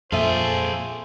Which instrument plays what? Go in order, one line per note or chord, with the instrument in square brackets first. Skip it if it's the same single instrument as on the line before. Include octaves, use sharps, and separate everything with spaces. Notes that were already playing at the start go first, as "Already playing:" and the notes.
[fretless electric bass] F2 A#2 [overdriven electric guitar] F4 G#4 [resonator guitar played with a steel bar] A4 E5 [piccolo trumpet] C5